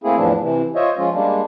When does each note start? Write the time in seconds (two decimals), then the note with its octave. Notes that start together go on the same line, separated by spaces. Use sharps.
0.04 A3 A#3 C4 E4 G#4
0.17 E2 A2 E3 F3 D4
0.41 C3 E3
0.75 F4 C5 C#5 D#5 E5
0.97 F3 G#3 C#4 F4
1.13 G3 G#3 A#3 D4